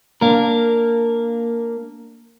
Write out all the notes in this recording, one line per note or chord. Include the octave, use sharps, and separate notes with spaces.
A#3 D4 A#4